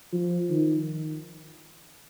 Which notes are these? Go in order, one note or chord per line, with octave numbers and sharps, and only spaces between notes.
F3
D#3